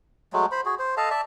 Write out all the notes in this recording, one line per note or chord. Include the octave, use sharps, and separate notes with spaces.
F#3 G#3 A3
C5 B5
F#4 G#4
C5
A4 D#5 F5 A5
D5 E5 A5